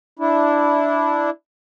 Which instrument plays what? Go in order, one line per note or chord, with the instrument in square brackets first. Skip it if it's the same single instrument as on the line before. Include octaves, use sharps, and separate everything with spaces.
[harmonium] D4 E4